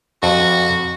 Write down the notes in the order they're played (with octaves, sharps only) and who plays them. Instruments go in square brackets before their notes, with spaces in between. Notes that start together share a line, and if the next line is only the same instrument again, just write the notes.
[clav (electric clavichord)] F2 [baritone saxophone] F#4